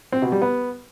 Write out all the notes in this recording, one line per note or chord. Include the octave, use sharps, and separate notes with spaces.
C4
B2
G3
B3